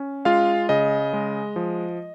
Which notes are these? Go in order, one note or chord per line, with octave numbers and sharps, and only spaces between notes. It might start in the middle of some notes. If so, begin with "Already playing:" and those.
Already playing: C#4
G#3 F4 F5
C#3 D#5
G#3
F3